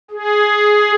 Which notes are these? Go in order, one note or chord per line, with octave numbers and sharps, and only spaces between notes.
G#4